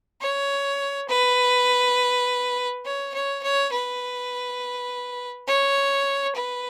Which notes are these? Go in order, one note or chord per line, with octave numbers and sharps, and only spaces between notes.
C#5
B4
C#5
C#5
C#5
B4
C#5
B4